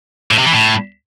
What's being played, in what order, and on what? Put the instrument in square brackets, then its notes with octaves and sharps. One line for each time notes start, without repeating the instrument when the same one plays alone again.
[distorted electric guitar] A2
C3
E3
A2